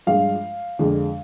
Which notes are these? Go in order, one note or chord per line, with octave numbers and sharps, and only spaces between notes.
G2 F3 G#3 F5
F2 D3 G#3